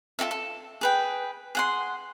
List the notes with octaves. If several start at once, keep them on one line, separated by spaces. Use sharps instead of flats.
F4 F#4 A4 E5
A4
G#4 B4 G5
G#4 F#5 C6